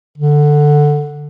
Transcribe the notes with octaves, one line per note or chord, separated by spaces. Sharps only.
D3